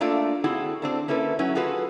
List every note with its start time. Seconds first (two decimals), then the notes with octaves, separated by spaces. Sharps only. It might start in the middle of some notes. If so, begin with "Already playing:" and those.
0.01 A3 A#3 D4 F4 A4
0.44 C4 E4 F#4 G#4 A4
0.82 C4 D4 A4
1.08 A#3 C#4 E4 A4 B4
1.39 F#3 C#4 E4
1.55 F4 F#4 G#4 A4 B4